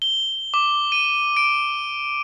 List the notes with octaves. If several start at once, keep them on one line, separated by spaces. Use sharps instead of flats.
G7
D6
D#7
D7